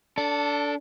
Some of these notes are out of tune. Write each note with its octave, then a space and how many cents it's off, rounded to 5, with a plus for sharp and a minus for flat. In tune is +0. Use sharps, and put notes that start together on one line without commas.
D4 -20 A4 +10